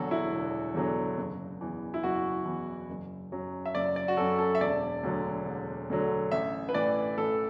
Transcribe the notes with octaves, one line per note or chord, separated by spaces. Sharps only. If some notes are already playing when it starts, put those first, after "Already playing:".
Already playing: E1 E2 D3 F#3 F#4 A4
E4
E1
E2 D3 F#3
F#1
E2 E3
E4
F#1 F#4
E2 E3
F#1
F#2 F#3
E5
F#1 D5
D5
F#4
F#2 F#3 A4
A4
E5
E1 D5
D2 D3 F#3
E1
D2 D3 F#3
A1 E5
B4
A2 E3 D5
A1 A4